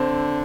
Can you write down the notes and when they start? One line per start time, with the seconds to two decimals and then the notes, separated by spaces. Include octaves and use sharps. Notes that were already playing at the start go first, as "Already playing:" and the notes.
Already playing: D3 C4